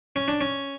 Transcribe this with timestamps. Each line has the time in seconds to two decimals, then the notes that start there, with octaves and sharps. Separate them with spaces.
0.16 C#4
0.28 D4
0.41 C#4